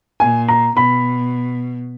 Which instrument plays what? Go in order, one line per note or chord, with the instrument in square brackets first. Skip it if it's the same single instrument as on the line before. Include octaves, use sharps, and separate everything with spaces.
[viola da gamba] A#2 [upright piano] G#5
[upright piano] A#5
[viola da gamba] B2 [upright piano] B5